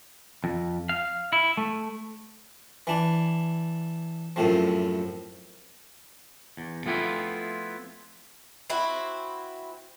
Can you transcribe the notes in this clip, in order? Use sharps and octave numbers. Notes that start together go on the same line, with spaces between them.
F2
F5
E4
A3
E3 D4
F#2 A2 C3 F3
E2
F3 A3 B3 C4 E4 F4
C4 E4 F#4